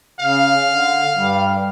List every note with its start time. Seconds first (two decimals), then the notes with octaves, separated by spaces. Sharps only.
0.20 C#3 F5
0.69 D3
1.16 G2 G3